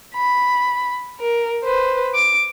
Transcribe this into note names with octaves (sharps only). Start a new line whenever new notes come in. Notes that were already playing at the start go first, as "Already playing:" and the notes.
B5
A#4
B4 C5
D6